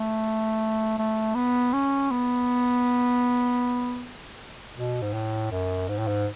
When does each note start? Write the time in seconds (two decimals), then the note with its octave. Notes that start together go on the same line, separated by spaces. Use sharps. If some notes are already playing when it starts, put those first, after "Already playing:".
Already playing: A3
0.98 A3
1.35 B3
1.73 C#4
2.11 B3
4.76 B2
5.02 G#2
5.13 A2
5.52 F#2
5.89 G#2
5.98 A2
6.07 G#2